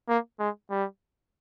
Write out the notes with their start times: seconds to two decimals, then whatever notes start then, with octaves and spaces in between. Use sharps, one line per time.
0.09 A#3
0.40 G#3
0.70 G3